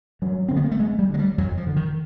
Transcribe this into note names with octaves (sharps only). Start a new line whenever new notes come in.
G2 F#3
D3 C4
B3
A#3
A3
G2 G#3
G3
D3
G#3
G3
F2 F#3
F3
D3
D#3